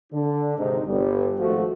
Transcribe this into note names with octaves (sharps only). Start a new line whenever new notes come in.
D3 D4
G#1 G#2 C3 D#4
G1 G3
G#1 F3 A3 F#4